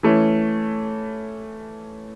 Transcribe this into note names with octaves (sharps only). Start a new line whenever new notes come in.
E3 A3 C#4